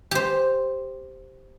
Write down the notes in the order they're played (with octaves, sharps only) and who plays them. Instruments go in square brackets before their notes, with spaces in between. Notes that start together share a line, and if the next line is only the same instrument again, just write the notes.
[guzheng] G4 C5